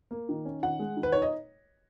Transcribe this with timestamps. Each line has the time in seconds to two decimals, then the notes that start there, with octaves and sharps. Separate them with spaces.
0.11 A#3
0.29 D#3
0.45 C#4
0.63 D#3 F#5
0.79 G#3
0.97 D#3
1.03 B4
1.12 D#4 C#5
1.22 D#5